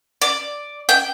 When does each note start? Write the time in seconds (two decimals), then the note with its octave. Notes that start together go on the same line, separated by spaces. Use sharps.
0.22 D5
0.89 G5